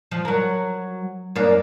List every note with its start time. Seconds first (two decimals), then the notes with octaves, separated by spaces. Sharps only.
0.11 F3
0.25 F#3 A#4
1.35 F#2 A#3 D4